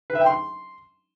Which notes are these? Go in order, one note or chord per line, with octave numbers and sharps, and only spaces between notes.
B4
E5
G5
C6